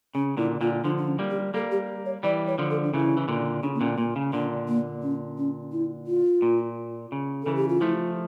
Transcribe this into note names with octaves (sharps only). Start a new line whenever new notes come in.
C#3 C#4
A#2 D3 E4
A#2 D3 F4
D3 F3 D4
D4
C#4
G3 A#3
G4
G3 A#3 A4
G4
C#5
E3 G3 D5
C#5
D3 F3
A4
D4
C#3 E3 E4
E3
A#2 D3
C#3 D4
A#3
A#2 D3 C#4
A#2 A#3
C#3
A#2 D3 D4
A#3
C#4
C#4
E4
F4
A#2
C#3
C#3 E3 A4
G4
F4
F3 A3 E4